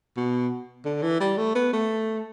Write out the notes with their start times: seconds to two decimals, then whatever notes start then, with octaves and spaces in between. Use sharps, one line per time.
0.17 B2
0.85 D3
1.02 E3
1.20 G3
1.37 A3
1.55 B3
1.73 A3